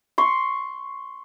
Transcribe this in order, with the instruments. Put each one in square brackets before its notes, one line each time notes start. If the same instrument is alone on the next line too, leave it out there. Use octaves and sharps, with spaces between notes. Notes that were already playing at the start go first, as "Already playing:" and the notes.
[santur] C6 C#6